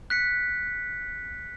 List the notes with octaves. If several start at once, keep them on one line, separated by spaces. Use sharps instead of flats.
F#6 B6 C#7